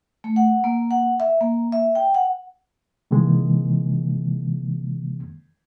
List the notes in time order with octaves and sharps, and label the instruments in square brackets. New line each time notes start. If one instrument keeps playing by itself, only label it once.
[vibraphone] A3
F#5
A#3
F#5
E5
A#3
E5
G5
F#5
[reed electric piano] C3 D#3 E3 G#3 A#3